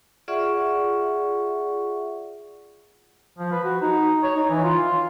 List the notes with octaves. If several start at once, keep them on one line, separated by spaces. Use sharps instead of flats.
F4 G#4 D5 E5 F#5 C#6
F3
B4
F#4
D#4
C#5
D#4
E3
F4
F4